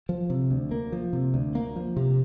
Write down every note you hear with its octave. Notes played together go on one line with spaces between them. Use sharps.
F3
C3
D2
A#3
F3
C3
D2
A#3
F3
C3